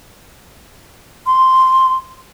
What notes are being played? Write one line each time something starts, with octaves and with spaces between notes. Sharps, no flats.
C6